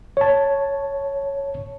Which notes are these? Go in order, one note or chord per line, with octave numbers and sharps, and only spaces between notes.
C#5 A5